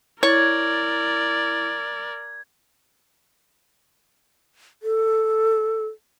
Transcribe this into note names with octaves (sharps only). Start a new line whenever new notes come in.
E4 A#4 C#5 D5 G#6 A6
A4